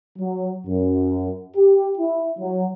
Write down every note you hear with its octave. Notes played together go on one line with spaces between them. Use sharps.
F#3
F#2
G4
E4
F#3